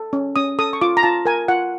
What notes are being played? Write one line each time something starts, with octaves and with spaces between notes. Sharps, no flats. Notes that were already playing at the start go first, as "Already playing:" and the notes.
Already playing: A4
C#4
C#4 D#6
A4 D#6
C#6
F4 D6
A#5
F4 A5
A#4 G#5
F4 F#5